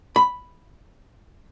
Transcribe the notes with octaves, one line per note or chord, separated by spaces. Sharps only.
B5